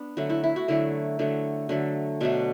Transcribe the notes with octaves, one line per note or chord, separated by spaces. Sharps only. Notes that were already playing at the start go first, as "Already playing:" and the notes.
Already playing: B3 D4
D3 F#3 A3 F#4
E4
E4
F#4
D3 F#3 A3 E4
D3 F#3 A3
D3 F#3 A3
B2 F#3 A3 D4